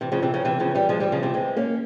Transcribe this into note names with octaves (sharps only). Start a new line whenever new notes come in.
C3 E3
C#3 F3
C3 E3
C#3 F3
C3 E3
C#3 F3
E3 G3
F3 G#3
E3 G3
C#3 F3
C3 E3
G#3 C4
A#3 C#4